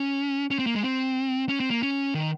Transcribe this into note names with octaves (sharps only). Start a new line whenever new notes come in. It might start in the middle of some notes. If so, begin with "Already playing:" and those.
Already playing: C#4
C#4
C4
A#3
G#3
C4
C#4
C4
A#3
C#4
D#3